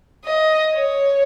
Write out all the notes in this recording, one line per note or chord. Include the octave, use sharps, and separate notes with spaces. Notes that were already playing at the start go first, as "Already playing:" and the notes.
D#5
C#5